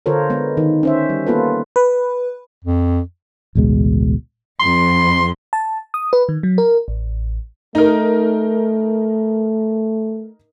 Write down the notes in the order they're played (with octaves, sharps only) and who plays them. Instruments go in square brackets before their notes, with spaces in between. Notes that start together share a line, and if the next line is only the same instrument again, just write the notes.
[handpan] D3 F4 A4 A#4 C5 C#5
G#3 B3
D#3
C#4 C5 E5
G3
A#3 B3 F4 A4 B4
[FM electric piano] B4
[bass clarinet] F2
[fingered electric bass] A1 D2 B2 G#3
[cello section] F2 [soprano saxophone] C6
[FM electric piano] A5
D#6
B4
D#3
F#3
A#4
A1
[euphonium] A3 [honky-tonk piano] D#4 A#4